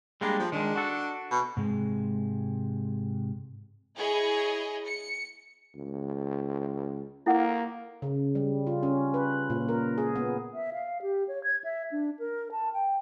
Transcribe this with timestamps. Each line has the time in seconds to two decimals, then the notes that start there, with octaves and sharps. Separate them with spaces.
0.21 G3 G#3 A#3 D4
0.40 F3
0.52 D#3 G#3 D4
0.76 F#4 A4
1.31 B2
1.57 G#2 C3 G#3
3.97 E4 G#4 C#5 D#5
4.86 C#7
5.75 C#2
7.26 A#3 E4 A4 F#5
8.02 C#3
8.35 G3
8.67 F4
8.83 C#4
9.14 B4
9.50 A#2
9.69 A#4
9.98 G#4
10.16 B3
10.54 E5
10.73 F5
11.02 G4
11.28 C#5
11.44 G#6
11.64 E5
11.92 D4
12.19 A#4
12.52 A5
12.73 G5